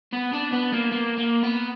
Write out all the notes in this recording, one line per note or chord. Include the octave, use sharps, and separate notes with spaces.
B3
D4
B3
A#3
A#3
A#3
B3